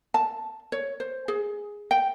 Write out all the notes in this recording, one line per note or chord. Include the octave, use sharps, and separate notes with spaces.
A5
C#5
C5
G#4
G5